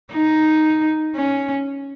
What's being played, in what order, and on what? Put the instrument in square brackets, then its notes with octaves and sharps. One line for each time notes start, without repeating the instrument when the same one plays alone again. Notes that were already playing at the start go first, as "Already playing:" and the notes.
[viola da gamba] D#4
C#4